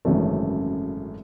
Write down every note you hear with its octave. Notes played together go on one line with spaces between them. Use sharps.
G#1 F#2 C#3 E3 A3